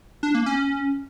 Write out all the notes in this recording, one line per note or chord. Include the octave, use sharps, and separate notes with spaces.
D4
A#3
C#4